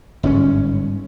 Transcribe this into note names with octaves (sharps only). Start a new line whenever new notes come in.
G1 G#2 C4 C#4